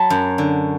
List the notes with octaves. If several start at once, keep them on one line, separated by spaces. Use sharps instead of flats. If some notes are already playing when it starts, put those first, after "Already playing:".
Already playing: F#3 A5 B5
F#2
D3